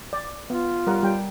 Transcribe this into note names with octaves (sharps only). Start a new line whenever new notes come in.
D5
B3 F4
G3 A#4 F#5
G3 G5